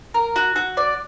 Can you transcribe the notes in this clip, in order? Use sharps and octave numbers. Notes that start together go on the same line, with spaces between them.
A#4
F#4
F#4
D5